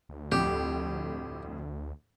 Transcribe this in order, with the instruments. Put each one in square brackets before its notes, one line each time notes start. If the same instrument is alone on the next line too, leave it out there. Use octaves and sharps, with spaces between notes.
[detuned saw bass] D2
[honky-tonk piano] C2 F2 A2 [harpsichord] G4